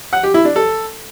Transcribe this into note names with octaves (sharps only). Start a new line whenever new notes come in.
F#5
G4
E4
D4
A4